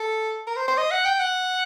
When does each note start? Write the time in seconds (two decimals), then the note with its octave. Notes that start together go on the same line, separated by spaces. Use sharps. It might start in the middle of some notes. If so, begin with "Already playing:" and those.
Already playing: A4
0.47 A#4
0.56 C5
0.68 C5
0.77 D#5
0.91 F#5
1.05 G5
1.19 F#5